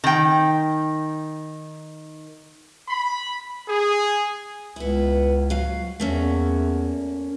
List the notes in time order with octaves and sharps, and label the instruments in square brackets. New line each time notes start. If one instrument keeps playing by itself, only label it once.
[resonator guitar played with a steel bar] D#3 G5
[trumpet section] B5
G#4
[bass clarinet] C#2 [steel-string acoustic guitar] B3 E4
[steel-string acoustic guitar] F#3 F5
[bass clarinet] E2 [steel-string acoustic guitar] A3 A#3 C#4